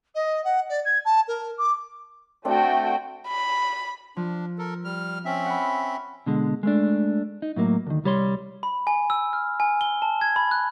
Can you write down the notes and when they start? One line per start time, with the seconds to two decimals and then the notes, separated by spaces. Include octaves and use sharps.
0.14 D#5
0.44 F#5
0.69 D5
0.85 G#6
1.05 A5
1.28 A#4
1.58 D6
2.45 A3 C4 D4 F#4 F#5 G5
3.28 B5
4.17 F3 D4
4.58 A4 A#4
4.84 G3 F6
5.25 C4 C#4 E5
5.46 F#5 B5
6.26 B2 D3 G#3
6.63 G#3 A3 D4
7.42 D#4
7.56 A2 F#3 A#3
7.87 D2 D#3
8.04 C2 G3 C#5 C6
8.63 B5
8.87 G#5
9.10 E6
9.33 F6
9.60 G#5
9.81 G7
10.02 A5
10.21 G#6
10.36 B5
10.51 F#6